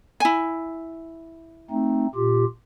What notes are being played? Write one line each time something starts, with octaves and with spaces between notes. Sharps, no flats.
E4 G#5
A3 C4 D#4
A#2 F4 G4